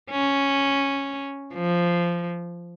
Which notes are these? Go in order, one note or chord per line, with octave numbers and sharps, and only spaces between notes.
C#4
F3